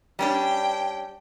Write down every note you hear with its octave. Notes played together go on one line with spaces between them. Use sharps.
G3 C#4 D4 G5